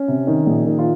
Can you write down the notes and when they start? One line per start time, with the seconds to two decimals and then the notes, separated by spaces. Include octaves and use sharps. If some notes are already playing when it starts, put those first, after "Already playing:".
Already playing: C#4
0.08 C3
0.27 D#3
0.46 A#1
0.65 D#3
0.79 F4